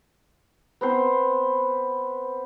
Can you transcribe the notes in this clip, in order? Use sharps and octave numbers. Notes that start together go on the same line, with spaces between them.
B3 C4 C5